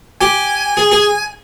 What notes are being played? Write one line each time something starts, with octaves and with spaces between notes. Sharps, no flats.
G4 G#5
G#4
G#4